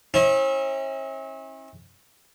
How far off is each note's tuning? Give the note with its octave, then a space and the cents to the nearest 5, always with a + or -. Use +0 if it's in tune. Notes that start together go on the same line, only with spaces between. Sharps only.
C#4 -45 E4 -35